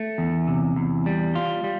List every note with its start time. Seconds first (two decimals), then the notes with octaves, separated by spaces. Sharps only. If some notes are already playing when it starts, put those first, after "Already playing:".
Already playing: A3
0.18 E2
0.48 C3
0.76 E2
1.06 G3
1.35 F4
1.64 G3